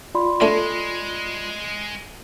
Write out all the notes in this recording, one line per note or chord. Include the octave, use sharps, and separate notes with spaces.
F4 D5 B5 C6
D3 G#3 A3 D4